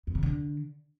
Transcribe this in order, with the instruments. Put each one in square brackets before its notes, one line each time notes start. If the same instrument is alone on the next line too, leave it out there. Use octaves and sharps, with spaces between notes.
[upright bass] F2
C#3
D3